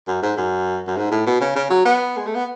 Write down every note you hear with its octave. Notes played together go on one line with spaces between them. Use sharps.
F#2
G#2
F#2
F#2
G#2
A2
B2
C#3
C#3
F#3
B3
G#3
A3
B3